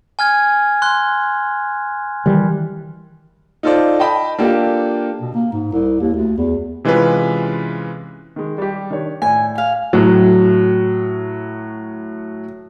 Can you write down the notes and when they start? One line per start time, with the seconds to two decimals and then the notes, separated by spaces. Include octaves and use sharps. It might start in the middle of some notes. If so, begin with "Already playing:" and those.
0.19 G#5 F6 G#6
0.82 C6 F#6
2.26 D#3 E3 G3
3.63 D#4 F4 A4 C5 D5
3.99 D#5 G5 A5 B5
4.39 A#3 D4 F4 G4 A4
5.21 B2
5.34 A#3
5.52 G#2
5.72 C2
6.01 D#2
6.14 D2
6.38 E2
6.85 C3 E3 G#3 C#4 F4 B4
8.36 D#3 G#3
8.58 G3 G4
8.90 D#3 D4 C#5
9.22 A2 D5 G#5
9.55 F5 G#5
9.93 A2 F#3